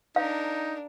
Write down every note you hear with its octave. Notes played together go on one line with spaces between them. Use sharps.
D4 D#4 A#4 F5